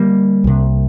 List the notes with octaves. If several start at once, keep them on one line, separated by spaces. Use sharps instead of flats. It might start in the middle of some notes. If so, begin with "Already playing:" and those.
Already playing: D3 G3 A#3
C2 C3